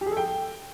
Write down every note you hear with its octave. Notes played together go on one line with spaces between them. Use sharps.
G4
G#4
A4
G5